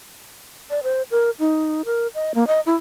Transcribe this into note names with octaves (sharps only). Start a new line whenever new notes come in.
D5
C5
A#4
D#4
A#4
D#5
A#3
D#5
E4